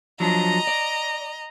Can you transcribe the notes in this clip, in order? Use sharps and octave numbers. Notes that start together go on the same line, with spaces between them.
F3 F#3 D4 D#5 A#5
D5